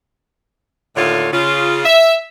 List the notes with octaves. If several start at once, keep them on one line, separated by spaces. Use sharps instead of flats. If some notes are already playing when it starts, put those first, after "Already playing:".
D#2 A2 D3 A3 F4 C#5
C#3 F4
E5